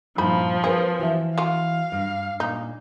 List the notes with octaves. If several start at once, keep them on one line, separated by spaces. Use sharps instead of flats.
G2 A#2 F3 D#4 E4 B5
C4 G#4 A#4 B4
E3 F#4 E5
F#3 F4 F5
G2
A#2 D#4